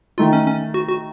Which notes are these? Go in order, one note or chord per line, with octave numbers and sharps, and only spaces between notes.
D#3 A3 D#4 F4
C#4
C#4
F#4
F#4